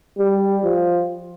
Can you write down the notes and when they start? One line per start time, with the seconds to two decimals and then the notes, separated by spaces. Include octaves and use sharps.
0.19 G3
0.64 F3